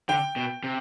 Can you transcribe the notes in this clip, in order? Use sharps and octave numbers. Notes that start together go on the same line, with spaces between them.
D3 G5
B2
C3